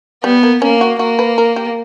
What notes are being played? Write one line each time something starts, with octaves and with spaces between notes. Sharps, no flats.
G3 B3
A#3
A#3 C#4
F#4
A#3 F#4
B4
A#4
G4